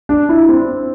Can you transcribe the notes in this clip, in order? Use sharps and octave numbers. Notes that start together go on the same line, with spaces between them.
D4
E4
C4